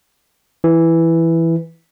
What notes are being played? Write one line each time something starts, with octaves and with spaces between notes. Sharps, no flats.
E3